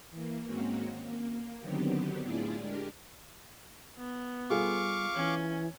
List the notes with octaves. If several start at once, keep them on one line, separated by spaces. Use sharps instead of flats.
E3 A#3
G#2 D#3 A#3 C4 C#4 F#4
A#3
D3 D#3 F#3 B3 C4 G4
A2 D3 E4 F4 G#4 D5
G#3 D4 G4 A#4
B3
G3 F4 G#4 A4 F5 C#6 D6
E3 C#4